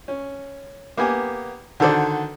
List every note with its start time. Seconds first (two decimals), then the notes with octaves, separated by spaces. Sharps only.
0.08 C#4
0.97 A#3 B3 G4 G#5
1.80 D3 D#3 F#4 A4 C5 D5